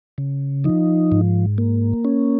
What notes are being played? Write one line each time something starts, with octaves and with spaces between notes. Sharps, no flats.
C#3
F3 D#4
G#2
A#3
C#4